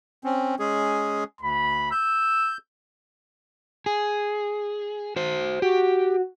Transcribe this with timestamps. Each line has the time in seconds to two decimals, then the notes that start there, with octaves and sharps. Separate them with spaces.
0.24 C4 C#4
0.59 G#3 C#4 G#4
1.41 D2 B5
1.92 E6 G6
3.86 G#4
5.16 F#4 C5
5.62 F#4 G4